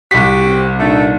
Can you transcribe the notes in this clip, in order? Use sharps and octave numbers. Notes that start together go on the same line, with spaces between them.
C2 F#4 G4 B6
C4
A#2 A3 D4 D#4